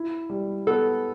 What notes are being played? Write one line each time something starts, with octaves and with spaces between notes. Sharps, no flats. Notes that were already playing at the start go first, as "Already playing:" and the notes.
Already playing: E4
G3
B3 A4